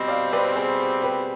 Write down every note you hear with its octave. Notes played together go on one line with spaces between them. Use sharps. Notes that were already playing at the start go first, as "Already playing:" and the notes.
Already playing: B2 G3 C4 C5 D#5
D5 F5
B4 D5
G#4 C5
G4 B4